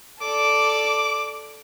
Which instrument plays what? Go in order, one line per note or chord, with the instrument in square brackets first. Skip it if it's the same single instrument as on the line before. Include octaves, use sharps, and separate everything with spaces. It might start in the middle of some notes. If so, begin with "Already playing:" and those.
[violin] A4 D5 [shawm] D6